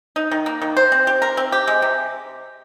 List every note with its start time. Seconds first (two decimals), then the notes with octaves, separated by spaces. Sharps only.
0.16 D#4
0.31 D#3
0.46 A#3
0.62 D#3
0.77 C5
0.92 C4
1.07 G4
1.22 A#4
1.37 C4
1.52 G4
1.67 G#3
1.82 C3